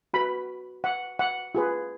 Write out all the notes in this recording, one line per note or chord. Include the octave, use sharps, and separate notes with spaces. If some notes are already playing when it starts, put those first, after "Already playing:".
F#4 B4 B5
F#5
F#5
F4 G#4 B4